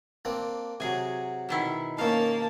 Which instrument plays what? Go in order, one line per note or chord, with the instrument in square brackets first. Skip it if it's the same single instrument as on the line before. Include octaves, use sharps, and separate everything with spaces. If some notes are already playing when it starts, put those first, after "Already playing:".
[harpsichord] A#3 C4 D4
[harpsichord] C3 F#3 [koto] G#4 G#5
[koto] B2 D#3 E4
[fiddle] A#3 A5 [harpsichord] C#4 D#4 [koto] F5